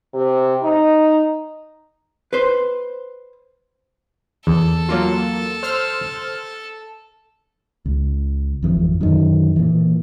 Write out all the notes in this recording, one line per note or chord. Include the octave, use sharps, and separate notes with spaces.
C3
D#4
B4 C5
E2 A4
F#3 A#3 F4
C5 E6 F6
C#2
G#1 F2 E3
F#2 D3 D#3
A#2 E3